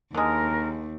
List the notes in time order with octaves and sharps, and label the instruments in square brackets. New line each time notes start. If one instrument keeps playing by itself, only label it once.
[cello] D#2 [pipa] D3 G#3 [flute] A#4